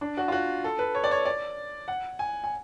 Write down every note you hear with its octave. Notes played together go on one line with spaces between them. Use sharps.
D4
F#4
F4
F#4
A4
B4
C#5
D5
C#5
D5
F#5
G#5
G#5